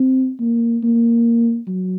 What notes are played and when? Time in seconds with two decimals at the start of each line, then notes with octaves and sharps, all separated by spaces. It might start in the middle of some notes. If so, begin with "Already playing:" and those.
Already playing: C4
0.40 A#3
0.83 A#3
1.67 F#3